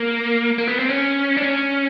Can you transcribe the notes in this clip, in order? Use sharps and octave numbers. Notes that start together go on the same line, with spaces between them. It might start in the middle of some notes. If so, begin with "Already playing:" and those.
Already playing: A#3
A#3
B3
C4
C#4
D4
C#4